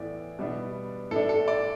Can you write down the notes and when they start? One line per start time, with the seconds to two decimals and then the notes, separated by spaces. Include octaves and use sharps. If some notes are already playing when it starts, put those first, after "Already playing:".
Already playing: A2 E3 B3 D5 E5
0.38 B2 G3 B3 D4
1.11 A2 A3 D4 A4
1.29 A4
1.48 D5